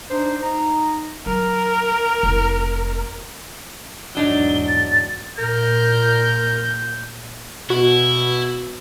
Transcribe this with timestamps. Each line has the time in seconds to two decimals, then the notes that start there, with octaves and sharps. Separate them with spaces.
0.10 D4 D#4 C5
0.42 D#4 A#5
1.26 F#3 A#4
2.23 F1 E4
4.15 B1 E2 G#2 F#3 D4 D#4 G7
4.68 A6
5.38 A#2 A#4 G6
7.70 B2 E4 F#4